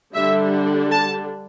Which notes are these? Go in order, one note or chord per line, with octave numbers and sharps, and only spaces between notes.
D3 G3 D4 E5
A5